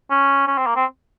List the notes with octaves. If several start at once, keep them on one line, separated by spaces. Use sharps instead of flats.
C#4
C#4
C4
A#3
C4